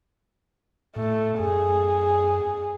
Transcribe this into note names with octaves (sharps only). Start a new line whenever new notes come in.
A2 A3
F#2 G#4